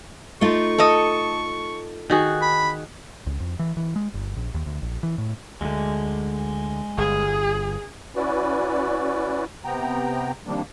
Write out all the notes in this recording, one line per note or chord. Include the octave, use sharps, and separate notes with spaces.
A3 D#4 F4 C#6
A4 D#5
D#3 F#4 G#4
B5
C#2
F2
E3
E3
G#3
G1
A#1
D#2
D2
A#1
E3
A2
D2 D3 G#3
G1 G#4
C#4 E4 F#4 B4 D5
C3 B3 G5 A#5
C3 D#3 F3 G3 A#3 D4